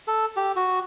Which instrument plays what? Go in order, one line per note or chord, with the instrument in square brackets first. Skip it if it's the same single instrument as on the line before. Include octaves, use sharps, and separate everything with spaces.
[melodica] A4
G4
F#4